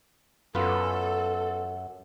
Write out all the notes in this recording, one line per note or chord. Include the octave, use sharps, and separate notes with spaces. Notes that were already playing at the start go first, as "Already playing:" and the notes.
F#2 B3 F4 A4 B4